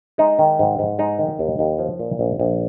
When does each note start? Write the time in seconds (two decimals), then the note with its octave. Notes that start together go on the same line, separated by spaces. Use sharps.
0.18 G#3 D#4
0.39 D#3
0.59 G#2
0.79 G#2
0.99 G#3 D#4
1.19 D#3
1.39 D#2
1.59 D#2
1.79 F3
1.99 A#2
2.19 A#1
2.39 A#1